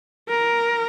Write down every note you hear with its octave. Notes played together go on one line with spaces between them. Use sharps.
A#4